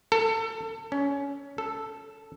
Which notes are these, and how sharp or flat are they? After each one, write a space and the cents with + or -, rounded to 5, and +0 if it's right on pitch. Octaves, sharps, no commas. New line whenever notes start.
A4 +25
C#4 +20
A4 +0